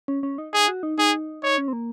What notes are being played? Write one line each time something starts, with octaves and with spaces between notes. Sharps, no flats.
C#4
C#4
D#4
D#4 G#4
F#4
D#4
D#4 G#4
D#4 C#5
C#4
C4
A#3